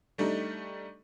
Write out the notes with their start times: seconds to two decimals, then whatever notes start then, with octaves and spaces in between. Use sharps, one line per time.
0.18 G3 A3 D4 D#4